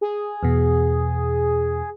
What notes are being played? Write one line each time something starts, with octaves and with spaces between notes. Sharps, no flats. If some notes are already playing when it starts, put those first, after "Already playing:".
G#4
E2 B2